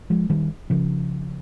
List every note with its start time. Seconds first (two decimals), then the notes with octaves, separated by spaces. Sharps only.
0.10 F3 G#3
0.30 D#3 G3
0.70 C#3 F3